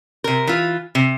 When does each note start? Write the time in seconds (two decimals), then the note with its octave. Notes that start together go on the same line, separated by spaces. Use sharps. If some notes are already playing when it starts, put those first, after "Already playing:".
0.24 C3 A#4
0.47 E3 F4
0.95 C3